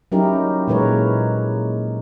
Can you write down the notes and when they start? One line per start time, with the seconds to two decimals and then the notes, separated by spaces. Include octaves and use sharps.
0.12 F#3 C#4 D#4 E4 G4 A#4
0.68 A#2 E3 G#3 A#4 B4 C#5